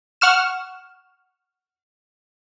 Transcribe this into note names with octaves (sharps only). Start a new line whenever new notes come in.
F#5 C#6 F6 E7